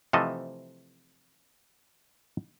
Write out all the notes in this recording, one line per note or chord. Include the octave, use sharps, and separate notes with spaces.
C3 E3 F3 A3 A4 D#5